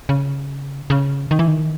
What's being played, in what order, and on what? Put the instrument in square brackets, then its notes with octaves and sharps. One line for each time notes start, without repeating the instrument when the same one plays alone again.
[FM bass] C#3
C#3
D#3
E3
D#3